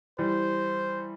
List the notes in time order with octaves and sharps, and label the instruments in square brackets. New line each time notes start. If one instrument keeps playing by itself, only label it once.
[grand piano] E3 G3 [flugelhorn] C5